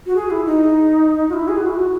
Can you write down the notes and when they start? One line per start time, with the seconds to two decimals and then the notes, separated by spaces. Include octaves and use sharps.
0.06 F#4
0.16 G#4
0.31 E4
0.46 D#4
1.29 F#4
1.34 E4
1.48 G#4
1.58 F#4
1.67 E4
1.76 F#4